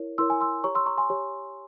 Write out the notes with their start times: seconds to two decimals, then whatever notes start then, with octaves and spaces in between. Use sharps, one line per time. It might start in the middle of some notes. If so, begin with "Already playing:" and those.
Already playing: E4 A#4 C#5
0.18 E4 A#4 C#5 C6 E6
0.30 G#5
0.41 C6 E6
0.64 G4 C#5 A#5 C#6
0.75 C6 E6
0.86 A#5 C#6
0.98 G#5 C6
1.10 G4 C#5